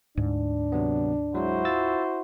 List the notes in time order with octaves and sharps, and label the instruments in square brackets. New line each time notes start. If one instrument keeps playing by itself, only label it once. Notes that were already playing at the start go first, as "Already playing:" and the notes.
[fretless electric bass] D2 G#2 [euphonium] D4
[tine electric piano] C3 F#3 B3
[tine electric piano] F#3 G#3 [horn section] E4 F#4 C5
[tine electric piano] F4 E6 A6